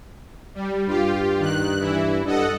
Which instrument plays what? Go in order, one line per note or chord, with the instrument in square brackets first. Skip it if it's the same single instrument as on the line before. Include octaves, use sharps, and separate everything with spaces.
[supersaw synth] G3
[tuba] G2 [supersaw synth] F4 G4
[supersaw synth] D#3 F#6
E3 E4
[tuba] G2 [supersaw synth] A4 D#5 F#5